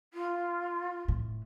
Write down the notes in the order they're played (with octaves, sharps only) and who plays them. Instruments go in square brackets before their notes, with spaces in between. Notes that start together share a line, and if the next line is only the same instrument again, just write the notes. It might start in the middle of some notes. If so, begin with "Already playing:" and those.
[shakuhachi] F4
[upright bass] A2